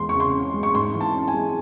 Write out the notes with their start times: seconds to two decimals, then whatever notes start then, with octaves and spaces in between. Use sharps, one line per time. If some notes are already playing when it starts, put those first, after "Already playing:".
Already playing: E2 G#3 C6
0.09 C#3 C#6
0.20 C6
0.34 C#4
0.54 G#3
0.63 C#6
0.75 G#2 C6
0.95 E3
1.01 A5
1.14 C#4
1.28 G#5
1.34 G#3